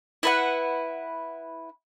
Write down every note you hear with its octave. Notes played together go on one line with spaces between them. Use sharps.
E4 B4 F#5